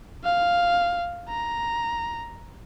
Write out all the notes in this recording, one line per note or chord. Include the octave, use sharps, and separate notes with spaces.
F5
A#5